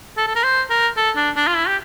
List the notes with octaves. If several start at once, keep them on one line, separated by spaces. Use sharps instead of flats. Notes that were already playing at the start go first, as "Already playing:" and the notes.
A4
A4
A#4
C5
A#4
A4
D4
D4
F4
E4
G4